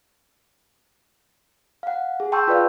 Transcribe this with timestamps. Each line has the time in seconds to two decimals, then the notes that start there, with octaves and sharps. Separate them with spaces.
1.83 F5 F#5
2.20 G#4
2.32 G5 A5 C6 C#6 E6 G6
2.47 F4 B4 D5 F5